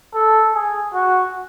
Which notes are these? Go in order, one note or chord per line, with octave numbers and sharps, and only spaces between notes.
A4
G#4
F#4